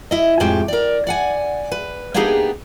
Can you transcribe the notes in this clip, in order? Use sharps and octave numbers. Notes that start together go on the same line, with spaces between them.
E4 D#5
F2 A2 G#3 G4 G5
A#4 D5
D5 F#5 G#5
B4
A#3 B3 D4 D#4 G4 G#4